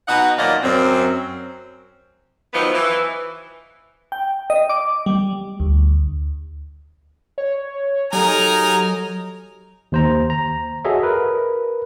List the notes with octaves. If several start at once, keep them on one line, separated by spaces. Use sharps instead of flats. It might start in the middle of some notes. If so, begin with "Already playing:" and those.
B2 D#4 D#5 F#5
A#2 D#3 F#3 D5 D#5 F5
F#2 C4
D#3 F3 F#3 B3 D#4
E3
G5
D#5
D6
G3
D2
C#5
F#3 D#4 G4 A4 A#4 G#5 A#5
D#2 C5 A#5
A#5
F#4 G#4 A4 C#5 D#5 E5
A#4 B4